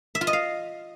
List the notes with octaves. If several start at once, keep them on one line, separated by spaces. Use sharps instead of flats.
E5
F4
D#5
F5